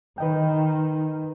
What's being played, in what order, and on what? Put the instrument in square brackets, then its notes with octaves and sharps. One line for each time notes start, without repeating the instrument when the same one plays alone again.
[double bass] D#3 [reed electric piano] B4 D#5 G5